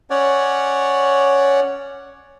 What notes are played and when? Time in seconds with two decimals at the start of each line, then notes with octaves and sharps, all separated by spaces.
0.10 C#4 C#5 D5 F#5